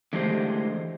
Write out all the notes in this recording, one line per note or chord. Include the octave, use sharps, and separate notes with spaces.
D3 E3 G#3 A3 G4 C5